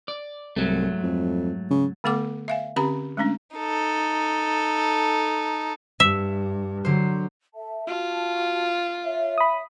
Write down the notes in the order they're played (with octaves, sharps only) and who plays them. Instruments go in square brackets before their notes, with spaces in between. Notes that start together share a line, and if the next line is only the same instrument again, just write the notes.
[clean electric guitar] D5
[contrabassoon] C2 [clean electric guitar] G#2 F#3 A3
[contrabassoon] F2
C#3
[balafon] D3 A3 B3 A4 F#5 D6
E5 F5 G#5
D3 C4 C#4 G4 A#5 B5
G#3 A3 C#4 D4
[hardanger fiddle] D#4 A4
[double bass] G2 [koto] E5
[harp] D3 C5 [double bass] F#3
[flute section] A4 E5 A5
[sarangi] F4 [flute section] F#4 A5
[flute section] C#5 E5
[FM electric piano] B5 D#6